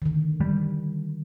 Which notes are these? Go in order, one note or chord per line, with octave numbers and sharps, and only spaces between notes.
D3 D#3
G3